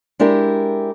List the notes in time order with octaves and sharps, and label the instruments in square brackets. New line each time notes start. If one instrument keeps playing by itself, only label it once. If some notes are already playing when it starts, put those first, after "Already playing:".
[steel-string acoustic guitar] G#3 D4 E4 G4 A#4